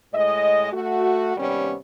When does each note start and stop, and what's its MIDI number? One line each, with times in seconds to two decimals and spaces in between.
0.13 0.70 45
0.13 0.70 56
0.13 0.70 75
0.72 1.35 57
0.72 1.35 66
1.37 1.74 39
1.37 1.74 48
1.37 1.74 55
1.37 1.74 59
1.37 1.74 61